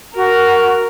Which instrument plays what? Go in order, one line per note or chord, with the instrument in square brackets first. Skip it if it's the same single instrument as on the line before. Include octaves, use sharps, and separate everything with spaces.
[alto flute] F#4 [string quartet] A#4